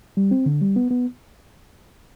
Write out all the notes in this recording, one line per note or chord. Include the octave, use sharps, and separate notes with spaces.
G3
C4
D3
G3
B3
B3